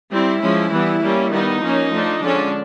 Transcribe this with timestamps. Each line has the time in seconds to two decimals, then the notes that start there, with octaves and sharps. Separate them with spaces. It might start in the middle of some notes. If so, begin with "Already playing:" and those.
0.10 G3 C4 E4
0.40 F3 G#3 C#4
0.70 E3 G3 B3
1.01 G3 A#3 C#4
1.30 D#3 G3 B3 D#4
1.60 F3 A#3 C#4
1.91 F3 A3 D4
2.21 D3 F3 G#3 C#4 D4